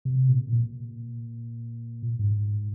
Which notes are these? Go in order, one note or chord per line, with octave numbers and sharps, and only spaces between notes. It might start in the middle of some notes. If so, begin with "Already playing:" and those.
C3
A#2
A#2
G#2